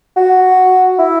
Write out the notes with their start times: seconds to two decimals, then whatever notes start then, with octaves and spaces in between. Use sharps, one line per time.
0.16 F#4
0.99 E4